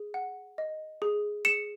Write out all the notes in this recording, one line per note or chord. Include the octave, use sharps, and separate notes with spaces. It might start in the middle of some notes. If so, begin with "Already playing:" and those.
Already playing: G#4
F#5
D#5
G#4
G#4 C#7 E7